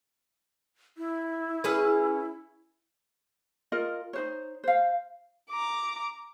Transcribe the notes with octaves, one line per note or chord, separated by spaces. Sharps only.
E4
C#4 G#4 B4
F4 A#4 D#5
D#4 C5 C#5
C5 F5
A#5 D6